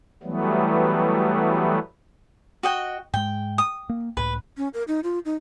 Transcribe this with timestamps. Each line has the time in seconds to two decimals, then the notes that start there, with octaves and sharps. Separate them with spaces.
0.23 E3 F#3 G3 A3 B3
2.63 F#4 D#5 G5
3.14 G#2 G#3 G5
3.58 D#6
3.89 A#3
4.17 C#2 A2 B4
4.57 C#4
4.74 A#4
4.88 D#4
5.03 F4
5.25 D#4